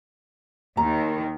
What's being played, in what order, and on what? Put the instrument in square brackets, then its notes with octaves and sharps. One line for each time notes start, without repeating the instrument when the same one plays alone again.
[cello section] D#2 D#3 [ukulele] A#5